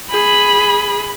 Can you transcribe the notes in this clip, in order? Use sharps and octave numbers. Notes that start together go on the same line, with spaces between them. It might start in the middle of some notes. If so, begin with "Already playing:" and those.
G#4 B5